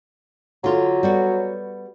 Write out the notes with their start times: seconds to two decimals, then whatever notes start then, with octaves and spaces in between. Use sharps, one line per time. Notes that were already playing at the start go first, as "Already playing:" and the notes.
0.64 D3 F#3 F4
1.03 G3 B3 F#4